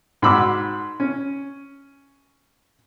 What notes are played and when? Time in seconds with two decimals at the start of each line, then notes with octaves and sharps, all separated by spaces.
0.22 G#2 F#4 B5 D6 E6
1.00 C#4